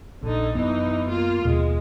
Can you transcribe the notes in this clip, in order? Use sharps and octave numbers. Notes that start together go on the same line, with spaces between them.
A#1 D3 D#4
F#2 E3 B3 D#4
A#3 F4
D#2 B2 G#3